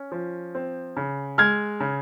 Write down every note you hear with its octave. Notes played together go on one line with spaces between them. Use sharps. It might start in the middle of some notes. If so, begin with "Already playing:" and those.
Already playing: C#4
F3
C4
C#3
G#3 F6 G#6
C#3